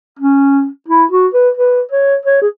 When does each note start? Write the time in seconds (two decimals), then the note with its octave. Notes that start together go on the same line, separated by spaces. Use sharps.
0.19 C#4
0.88 E4
1.11 F#4
1.34 B4
1.57 B4
1.91 C#5
2.26 C#5
2.42 G#4